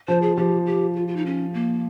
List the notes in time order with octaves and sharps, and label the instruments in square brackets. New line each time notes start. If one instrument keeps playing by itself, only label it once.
[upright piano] F3 [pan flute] C5
[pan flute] G#4
[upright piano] F3 [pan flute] G4
[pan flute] G4
F4
F4
D#4
C#4
A#3